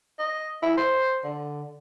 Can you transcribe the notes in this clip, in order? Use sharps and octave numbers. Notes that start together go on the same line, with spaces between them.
D#5
E4
C5
D3